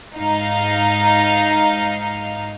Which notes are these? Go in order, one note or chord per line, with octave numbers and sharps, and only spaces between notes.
G#2 D#4 F5